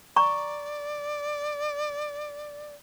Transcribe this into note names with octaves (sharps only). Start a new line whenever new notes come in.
D5 A#5 C#6